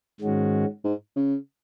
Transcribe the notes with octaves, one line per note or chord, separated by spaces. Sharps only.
G#2 D#3 G#3 C#4 F#4
G#2
C#3